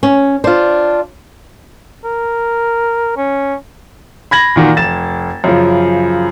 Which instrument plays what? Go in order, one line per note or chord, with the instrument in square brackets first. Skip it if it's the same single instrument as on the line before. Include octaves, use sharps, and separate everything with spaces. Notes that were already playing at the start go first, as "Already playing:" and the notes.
[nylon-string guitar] C#4
[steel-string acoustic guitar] D4 F4 [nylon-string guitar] C5
[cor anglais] A#4
C#4
[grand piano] B5 G#6 A#6 F#7
A#2 D#3 F#4
F1 A6 E7
F#2 C#3 F3